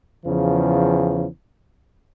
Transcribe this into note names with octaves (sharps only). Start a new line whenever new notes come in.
E2 C#3 F3